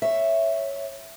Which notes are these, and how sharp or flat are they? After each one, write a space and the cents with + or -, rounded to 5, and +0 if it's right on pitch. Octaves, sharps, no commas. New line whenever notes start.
C#5 +0 E5 +0